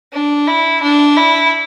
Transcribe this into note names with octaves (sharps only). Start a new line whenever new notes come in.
D4
E4
D4
E4